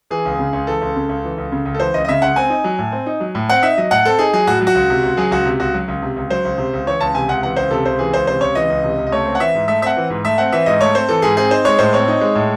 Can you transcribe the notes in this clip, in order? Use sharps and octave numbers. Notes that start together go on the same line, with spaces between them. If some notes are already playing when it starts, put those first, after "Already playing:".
E3 G#4
C#2
C#3
C#2
E3 A4
C#2
C#3
C#2
E3
C#2
C#3
C#2
A4
E3 C5
C#2 D#5
D#5
C#3 E5
C#2 F#5
C4 G#5
D#4
F#3
A2
C4
D#4
F#3
A2
C4 F#5
D#4 E5
F#3 D#5
A2 F#5
C4 A4
D#4 G#4
F#3 G#4
A2 F#4
F#3
F#4
C#2
C3
C#2
F#3 G#4
C#2 F#4
C3
C#2 F#4
F#3
C#2
C3
C#2
F#3 C5
C#2
C3
C#2
E3 C#5
C#2 A5
C3 G#5
C#2 F#5
E3 F#5
C#2 C5
C3 A4
C#2 C5
E3 G#4
C#2 C5
C3 C5
C#2 C#5
E3 D#5
C#2
C3
C#2
D#5
A3 C#5
C4
F#5
E3 E5
G#2
A3 E5
C4 E5 F#5
E3
G#2
A3 E5
C4 F#5
E3 E5
G#2 D#5
A3 C#5
C4 C5
E3 A4
G#2 G#4
C4 G#4
D#4 C5
G#3 C#5
A2 C5
C4 C#5
D#4
G#3
A2